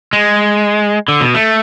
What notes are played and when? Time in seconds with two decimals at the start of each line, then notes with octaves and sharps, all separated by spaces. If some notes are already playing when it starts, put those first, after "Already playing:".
0.13 G#3
1.08 D3
1.21 B2
1.34 A3